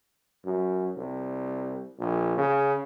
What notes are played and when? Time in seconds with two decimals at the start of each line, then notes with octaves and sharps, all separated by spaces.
0.45 F#2
0.96 C2
1.99 A#1
2.37 C#3